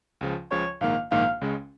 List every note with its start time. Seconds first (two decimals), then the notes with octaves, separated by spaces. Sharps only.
0.21 C#2 C#3 F3
0.51 C#2 C#3 F3 C#5
0.81 A#1 G#2 D#3 A#3 F5
1.11 A#1 G#2 D#3 A#3 F5
1.41 C#2 C#3 G#3 C#4